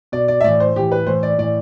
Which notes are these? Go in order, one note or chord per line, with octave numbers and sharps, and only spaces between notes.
B2 D5
D5
E5
A2 E3 D5
C5
A2 E3 G4
B4
A2 E3 C5
D5
A2 E3 D5